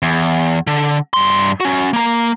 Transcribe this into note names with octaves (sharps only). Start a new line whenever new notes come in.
E2
D3
G2 C6
C#4 F#4
A#3 A#5